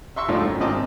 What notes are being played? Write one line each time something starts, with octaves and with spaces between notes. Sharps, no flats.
E5 C6 C#6 E6
A2 F3 G#3 D4 D#4 F4
F#2
G#1 A#2 C4 D#5 A5 D6